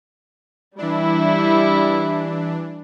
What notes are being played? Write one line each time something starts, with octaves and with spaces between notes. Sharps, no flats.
E3 G3 D4 E4